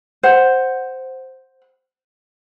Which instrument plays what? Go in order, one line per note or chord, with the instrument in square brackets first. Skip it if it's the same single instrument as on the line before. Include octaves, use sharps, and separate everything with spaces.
[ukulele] C5 F#5